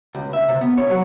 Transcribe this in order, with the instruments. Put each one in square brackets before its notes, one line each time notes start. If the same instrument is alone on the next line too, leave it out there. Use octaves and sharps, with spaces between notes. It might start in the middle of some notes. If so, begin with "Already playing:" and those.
[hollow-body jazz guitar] C#2
E5
C3
B3
C#5
F#3